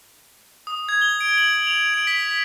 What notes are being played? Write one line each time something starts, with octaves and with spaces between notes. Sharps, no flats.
D#6
G#6
G7
D7
F#7
F7
D7
B6